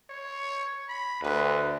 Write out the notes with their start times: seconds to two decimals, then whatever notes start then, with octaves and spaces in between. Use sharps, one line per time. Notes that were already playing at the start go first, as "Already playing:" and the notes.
0.10 C#5
0.89 B5
1.23 D2 B4